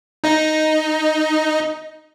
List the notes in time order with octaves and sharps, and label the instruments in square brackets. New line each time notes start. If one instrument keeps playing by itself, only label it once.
[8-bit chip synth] D#4 D#5